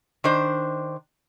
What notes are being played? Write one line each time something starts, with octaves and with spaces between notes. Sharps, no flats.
D#3 D4 C5